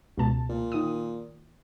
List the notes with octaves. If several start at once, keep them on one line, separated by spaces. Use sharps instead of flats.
C#2 B2 A5
A#2
D#3 D#6